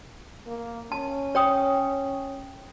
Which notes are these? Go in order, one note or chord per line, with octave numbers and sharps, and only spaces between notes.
A#3
C#4 A5
C#5 G5 D#6